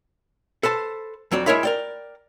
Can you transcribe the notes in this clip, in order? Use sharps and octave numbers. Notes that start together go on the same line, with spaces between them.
A4 B4 C5 A5
F2 F#3 C4 D5
G#3 E4 A#4 C#5 E5 B5
A#4 D5 G5